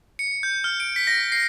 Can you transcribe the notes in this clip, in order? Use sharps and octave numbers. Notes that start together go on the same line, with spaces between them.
C#7
G6
F6
D7
B6
A#6
C7